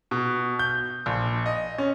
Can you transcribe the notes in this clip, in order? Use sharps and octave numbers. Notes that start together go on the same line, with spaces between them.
B2
G6
A#1
D#5
C#4